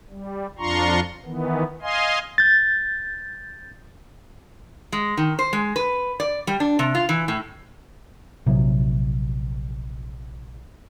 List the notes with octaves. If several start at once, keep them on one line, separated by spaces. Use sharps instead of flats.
G3
F2 D4 F4 A#5 C6 C#6
D#3 E3 B3
D#5 F5 G#5 C6
G6 A6
G#3
D#3
C5
G#3
B4
D5
G3
D4
C3
F4
E3
A2
A#1 C3 F#3